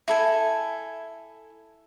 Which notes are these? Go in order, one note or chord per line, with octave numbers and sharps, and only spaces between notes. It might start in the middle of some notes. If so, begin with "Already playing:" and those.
E4 A4 G#5